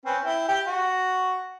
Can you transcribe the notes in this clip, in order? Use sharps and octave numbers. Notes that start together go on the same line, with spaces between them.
C4 C#4 B4
E4 G5
G4 G5
F#4